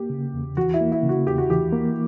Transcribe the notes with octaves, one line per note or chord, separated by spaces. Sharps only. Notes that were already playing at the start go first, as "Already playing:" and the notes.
Already playing: A#3 G4
C#3
E2
E3 F#4
E4
A#3
E4
C#3
F#4
E2 G4
F#4
E3 G4
A#3